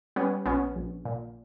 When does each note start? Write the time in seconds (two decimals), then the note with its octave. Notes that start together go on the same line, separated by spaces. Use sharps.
0.16 G3 B3 C#4
0.46 A#1 B3 C#4
0.76 A#1
1.05 A#2